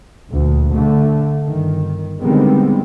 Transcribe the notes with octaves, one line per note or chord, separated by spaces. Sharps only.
D2 A#2
D3 A3
G1 D#3
D3 D#3 G3 G#3 B3 C4